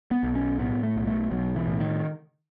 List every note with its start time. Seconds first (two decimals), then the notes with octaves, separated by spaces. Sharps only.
0.11 B3
0.23 B1
0.35 C#4
0.59 A2 B3
0.83 A3
0.96 B1
1.07 A3
1.31 B1 F#3
1.56 E3
1.67 A2
1.80 D#3